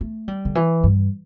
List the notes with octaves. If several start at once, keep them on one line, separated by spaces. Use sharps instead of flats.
A3
G3
D3
E3
G2